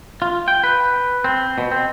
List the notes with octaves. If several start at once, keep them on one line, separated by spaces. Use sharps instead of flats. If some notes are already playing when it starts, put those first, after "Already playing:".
F4
G5
B4
C4
B2
C4